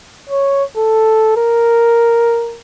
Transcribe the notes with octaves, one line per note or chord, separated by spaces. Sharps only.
C#5
A4
A#4